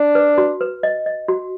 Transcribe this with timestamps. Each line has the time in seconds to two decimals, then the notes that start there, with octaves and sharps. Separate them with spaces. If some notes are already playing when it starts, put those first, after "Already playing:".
Already playing: D4
0.15 B4
0.38 F#4
0.61 B4
0.83 D#5
1.06 D#5
1.28 F#4